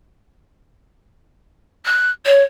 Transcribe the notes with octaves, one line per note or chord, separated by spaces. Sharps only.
F#6
C#5